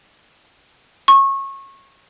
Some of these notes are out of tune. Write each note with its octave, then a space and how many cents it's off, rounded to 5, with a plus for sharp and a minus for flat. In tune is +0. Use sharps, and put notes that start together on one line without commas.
C#6 -25